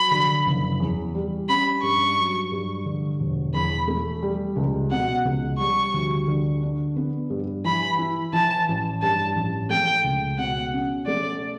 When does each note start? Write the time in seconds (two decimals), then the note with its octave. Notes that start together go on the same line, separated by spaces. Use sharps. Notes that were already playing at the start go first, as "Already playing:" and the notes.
Already playing: F#3 B5
0.11 D3
0.46 F#1
0.80 E2
1.15 G3
1.49 C#4 B5
1.83 G2 C#6
2.18 F#3
2.52 G2
2.86 D3
3.20 E1
3.54 E2 B5
3.88 A3
4.22 G3
4.56 C#2
4.91 B2 F#5
5.25 C#2
5.59 G3 C#6
5.94 D2
6.27 D3
6.63 D4
6.96 B3
7.30 G2
7.64 E3 B5
7.99 E4
8.33 E3 A5
8.68 A1
9.02 G2 A5
9.35 A1
9.70 A3 G5
10.04 C#2
10.38 B2 F#5
10.73 C#4
11.07 A3 D5